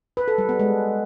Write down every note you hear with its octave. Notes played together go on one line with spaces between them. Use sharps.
B4
A4
G3
B3
G#3